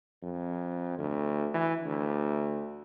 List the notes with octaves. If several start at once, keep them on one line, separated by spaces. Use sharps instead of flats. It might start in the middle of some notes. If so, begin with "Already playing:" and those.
F2
D2
E3
D2